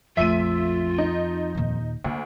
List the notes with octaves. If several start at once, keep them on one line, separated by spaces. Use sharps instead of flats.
A#1 F2 A3 F4 E5 D#7
D#4
D#2 A#2
D2 A#3